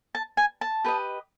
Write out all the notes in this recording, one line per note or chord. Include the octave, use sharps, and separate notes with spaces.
A5
G#5
A5
G4 B4 D#5